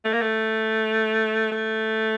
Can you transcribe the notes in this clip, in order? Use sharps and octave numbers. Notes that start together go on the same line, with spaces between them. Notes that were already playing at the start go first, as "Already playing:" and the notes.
A3
A#3
A3
A3